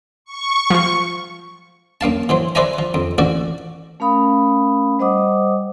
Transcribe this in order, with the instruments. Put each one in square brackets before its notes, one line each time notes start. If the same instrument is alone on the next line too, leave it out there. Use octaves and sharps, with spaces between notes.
[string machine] C#6
[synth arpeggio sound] F3 F4
[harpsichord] F#2 A#3 F5 A5
E3 F#3 C5
B4 C5 D5 E5 G#5 A#5
F3
F2
A1 F#4 D5
[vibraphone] A3 C#4 A#4 F5 B5 D#6
G3 C5 D#5 F#5 D6 D#6